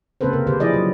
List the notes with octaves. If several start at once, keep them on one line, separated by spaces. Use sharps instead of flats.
C#3 A#3 C4 A4 B4 C5
C3 A#4
D3 G4 B4 C5
F3 E4 G#4 D5 D#5
F#3